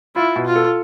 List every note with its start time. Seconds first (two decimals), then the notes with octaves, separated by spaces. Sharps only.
0.15 E4 F4
0.36 B2
0.46 F4
0.56 A4